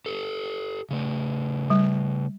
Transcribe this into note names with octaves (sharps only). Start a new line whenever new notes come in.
G4 A4
C#3 A3
G3